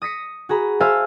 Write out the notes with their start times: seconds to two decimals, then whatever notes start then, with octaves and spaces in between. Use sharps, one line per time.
0.02 D#6 A#6 B6 C#7
0.49 F#4 G#4 A#5 B5
0.80 C5 E5 F5 G#5 A5 E6